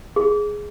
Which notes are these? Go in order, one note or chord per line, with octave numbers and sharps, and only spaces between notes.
G#4